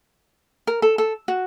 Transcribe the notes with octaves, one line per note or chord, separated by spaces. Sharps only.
A#4
A4
A4
F#4